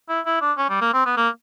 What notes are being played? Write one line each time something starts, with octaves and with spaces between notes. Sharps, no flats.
E4
E4
D4
C#4
G3
A#3
C4
B3
A#3